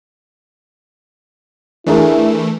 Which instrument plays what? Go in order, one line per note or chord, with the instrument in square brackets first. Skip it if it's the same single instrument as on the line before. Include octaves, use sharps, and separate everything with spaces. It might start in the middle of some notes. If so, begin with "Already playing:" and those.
[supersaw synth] E3 A3 [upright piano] D4 G#4 A#4 [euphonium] E4